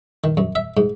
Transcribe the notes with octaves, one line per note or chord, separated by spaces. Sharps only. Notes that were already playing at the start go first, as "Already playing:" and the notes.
D#3
F#2
E5
G#2